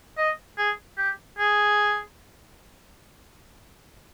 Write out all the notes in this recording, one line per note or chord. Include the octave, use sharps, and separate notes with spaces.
D#5
G#4
G4
G#4